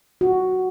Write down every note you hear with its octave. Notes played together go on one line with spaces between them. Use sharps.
F#4